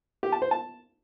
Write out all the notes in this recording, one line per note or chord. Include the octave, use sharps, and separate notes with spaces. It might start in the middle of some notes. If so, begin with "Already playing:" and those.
G4
A5
C5
A5